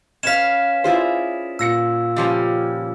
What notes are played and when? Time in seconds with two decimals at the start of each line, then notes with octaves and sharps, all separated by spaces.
0.23 C#4 B4 F5 B6 E7
0.84 E4 F4 G#4 C5 D5
1.59 A#2 E6 A#6 C#7
2.17 C#3 F3 G3 C#4